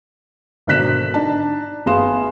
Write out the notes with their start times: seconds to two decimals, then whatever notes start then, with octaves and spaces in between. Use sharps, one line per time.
0.67 G#1 B2 D3 F#6 B6 E7
1.14 D4 D#4 A5
1.86 G1 B3 G#4 F5 C6 E7